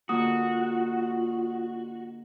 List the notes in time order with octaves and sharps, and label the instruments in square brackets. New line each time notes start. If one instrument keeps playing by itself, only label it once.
[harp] G#2 D3 A#3 [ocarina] F4 [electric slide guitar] F#4 [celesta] D#6